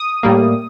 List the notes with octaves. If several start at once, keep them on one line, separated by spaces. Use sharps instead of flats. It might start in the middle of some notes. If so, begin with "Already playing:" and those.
Already playing: D#6
A2 G3 A#3